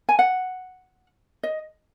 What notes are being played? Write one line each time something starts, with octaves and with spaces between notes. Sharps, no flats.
G#5
F#5
D#5